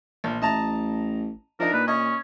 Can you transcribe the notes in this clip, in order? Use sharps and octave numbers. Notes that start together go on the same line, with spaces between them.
A#1
A1 D#5 A5 A#5
F3 D4 D#4 A#4
A#2 B4
C#4 D#5